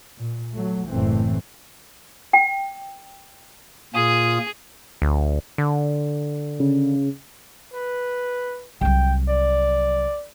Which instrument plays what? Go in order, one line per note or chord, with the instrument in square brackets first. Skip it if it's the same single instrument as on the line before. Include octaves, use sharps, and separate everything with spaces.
[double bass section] A#2
F#3 A3
F#1 A2 E3 A3 C4
[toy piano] G5
[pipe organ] A#2 F4 D#6 [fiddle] G#4
[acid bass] D2
D3
[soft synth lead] C#3
[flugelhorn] B4
[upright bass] C2 F#3 [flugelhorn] G5
[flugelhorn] D5